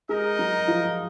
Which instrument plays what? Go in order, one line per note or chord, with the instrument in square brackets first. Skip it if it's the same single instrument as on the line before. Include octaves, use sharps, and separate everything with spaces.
[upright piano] G#3 G#4 [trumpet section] D#4 A#4 D#5
[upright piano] F#3 F#4
F3 F4